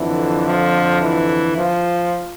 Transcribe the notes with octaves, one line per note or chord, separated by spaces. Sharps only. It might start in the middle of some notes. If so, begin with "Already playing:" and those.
Already playing: F2 D3 E3
F3
E3
F3